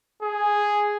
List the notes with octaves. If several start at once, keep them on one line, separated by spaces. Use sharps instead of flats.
G#4